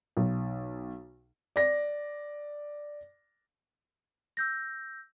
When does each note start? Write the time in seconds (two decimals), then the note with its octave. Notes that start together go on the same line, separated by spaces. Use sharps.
0.17 B1
1.56 D5 A#6
4.37 E6 G6 A#6